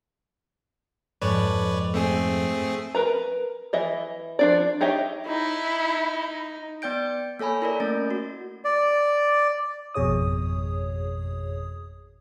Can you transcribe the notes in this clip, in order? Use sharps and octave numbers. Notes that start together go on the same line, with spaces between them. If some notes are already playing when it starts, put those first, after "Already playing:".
F2 G#2 B4 C#5 D5
A3 C4 G#4
A#4 B4 A#5
E3 D#5 E5
F3 D4 D5
D#4 G4 C#5 D#5 E5
D#4 E4
B3 D5 G5 G6 D7
A#3 A4 C#5 G#5 B5
E4 A#4 D5
A3 A#3 C#4 A6
F#4
D5
G#1 F2 B2 G#4 C#5 D#6